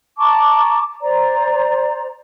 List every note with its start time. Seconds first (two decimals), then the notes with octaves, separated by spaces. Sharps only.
0.18 A5 A#5 C#6 D6
1.01 C5 D5 A#5